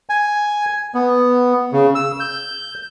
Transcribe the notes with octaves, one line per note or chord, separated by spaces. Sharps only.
G#5
B3
C#3
E6
G6